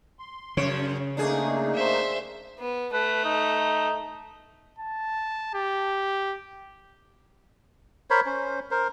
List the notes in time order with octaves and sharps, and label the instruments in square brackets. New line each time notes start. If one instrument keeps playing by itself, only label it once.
[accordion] C6
[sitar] F#2 E3 C#5 [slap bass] C#3
[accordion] A3 A#3 D#4 [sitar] D4 G#4
[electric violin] C5 E5
[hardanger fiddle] B3
[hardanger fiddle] A3 [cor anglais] B4
[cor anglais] D#4
[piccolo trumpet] A5
G4
[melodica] A#4 C5 C#5 B5
C#4 C5
A#4 C5